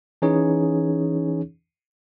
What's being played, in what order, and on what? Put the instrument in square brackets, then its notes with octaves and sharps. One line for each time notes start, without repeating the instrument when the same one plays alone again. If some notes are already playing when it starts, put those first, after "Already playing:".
[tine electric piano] E3 C#4 D#4 G#4 C#5